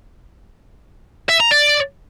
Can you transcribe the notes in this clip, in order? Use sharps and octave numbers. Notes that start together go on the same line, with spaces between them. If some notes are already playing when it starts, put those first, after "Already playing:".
E5
A#5
D5